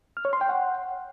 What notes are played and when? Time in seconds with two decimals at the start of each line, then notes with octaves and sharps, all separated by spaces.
0.17 F6
0.25 C#5
0.33 C6
0.41 G5
0.49 F#5